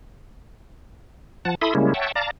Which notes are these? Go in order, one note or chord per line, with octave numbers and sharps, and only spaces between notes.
F3 F#5 A5
E4 A4 E5 B5 C6 D#6
C#3 G3 G#3 A#3 C#4 E4
C#5 E5 F#5 G5 A5
D5 F5 A5 A#5